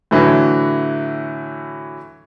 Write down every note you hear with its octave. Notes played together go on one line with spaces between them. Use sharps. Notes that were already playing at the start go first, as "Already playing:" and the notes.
A2 D3 E3 F#3